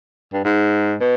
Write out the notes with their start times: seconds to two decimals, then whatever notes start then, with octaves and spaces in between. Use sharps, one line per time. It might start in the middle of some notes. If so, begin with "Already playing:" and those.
0.33 G2
0.44 G#2
1.01 B2